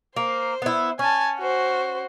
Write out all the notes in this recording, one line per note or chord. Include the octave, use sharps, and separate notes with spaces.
A#3 C5
B3 E4
C#4 G#5 A5
F#4 C5